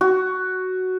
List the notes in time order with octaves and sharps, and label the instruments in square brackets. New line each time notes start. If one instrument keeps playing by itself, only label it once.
[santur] F#4